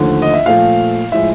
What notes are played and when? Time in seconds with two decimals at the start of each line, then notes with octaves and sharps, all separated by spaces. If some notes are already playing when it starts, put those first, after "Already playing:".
Already playing: D#2 D3 F3 A3
0.22 D#5
0.33 E5
0.46 A#2 F3 A3 F5
1.12 A2 F3 G#3 E5